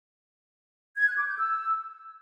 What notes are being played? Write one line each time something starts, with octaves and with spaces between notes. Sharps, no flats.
G#6
F#6
D6
G6
E6